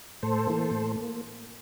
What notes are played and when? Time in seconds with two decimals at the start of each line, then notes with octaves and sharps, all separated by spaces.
0.23 A2 A4 C5
0.47 E3 A#3
0.71 A2
0.96 A#3